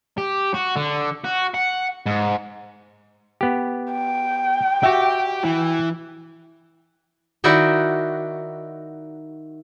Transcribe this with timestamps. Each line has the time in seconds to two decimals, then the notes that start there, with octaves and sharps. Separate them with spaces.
0.18 G4
0.54 F#4
0.76 D3
1.24 F#4
1.54 F#5
2.06 G#2
3.41 B3 G4
3.92 G5
4.83 F#4 G4 E5
5.44 E3
7.44 D#3 D#4 E4 F#4 D5